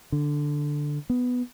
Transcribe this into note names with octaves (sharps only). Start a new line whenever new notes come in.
D3
B3